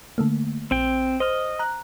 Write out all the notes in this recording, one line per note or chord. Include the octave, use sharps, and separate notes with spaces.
D3 A3 A#3
A#1 C4 G5
C5 D#5 F6
A#5 F#6